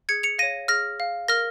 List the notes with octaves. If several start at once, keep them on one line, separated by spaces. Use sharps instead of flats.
G#4 G#6 C#7
C#7 F7
C#5 F5 A#6 D#7
G#4 F6 A#6
F5
A#4 F6 A#6